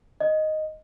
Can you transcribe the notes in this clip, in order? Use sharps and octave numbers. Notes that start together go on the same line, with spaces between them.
D#5